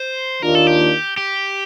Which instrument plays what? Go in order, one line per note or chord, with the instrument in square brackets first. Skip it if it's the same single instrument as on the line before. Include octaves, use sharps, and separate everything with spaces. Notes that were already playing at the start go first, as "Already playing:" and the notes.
Already playing: [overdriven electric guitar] C5
[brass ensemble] D#2 D#3 A#3 D4 F4 [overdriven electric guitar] A#4
[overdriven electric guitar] A4
G4
G4